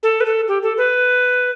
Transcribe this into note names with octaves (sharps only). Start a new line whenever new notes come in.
A4
B4
A4
G4
A4
B4